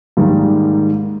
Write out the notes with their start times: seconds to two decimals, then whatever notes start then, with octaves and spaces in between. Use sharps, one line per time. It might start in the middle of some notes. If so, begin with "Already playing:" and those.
0.17 G#2 D#3 G3 A#3